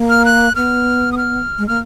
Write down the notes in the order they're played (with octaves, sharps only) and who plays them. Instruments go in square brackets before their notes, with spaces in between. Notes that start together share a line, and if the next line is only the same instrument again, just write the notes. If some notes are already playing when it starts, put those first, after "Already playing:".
Already playing: [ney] A#3
[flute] F6
F#6
[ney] B3 [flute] F6
[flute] D#6
F6
[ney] G#3
[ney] A#3 [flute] F6